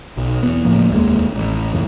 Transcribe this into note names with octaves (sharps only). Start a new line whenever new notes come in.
B1
E2 B3
C#2 A2 F3 A#3
F1 D#2 G#3 A#3
A1
F#1 E2 A2